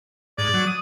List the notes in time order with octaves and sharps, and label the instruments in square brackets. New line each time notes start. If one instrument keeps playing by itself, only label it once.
[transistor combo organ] G#2 [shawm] D5
[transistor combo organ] F#3
D#6